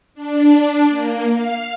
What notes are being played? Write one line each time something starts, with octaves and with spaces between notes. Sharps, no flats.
D4
A#3
F5